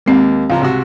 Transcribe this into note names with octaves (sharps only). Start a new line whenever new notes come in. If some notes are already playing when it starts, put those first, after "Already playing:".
D#2 G#3 A#3 C4
C#2 F3 F5 A#5
C2 C3 F#4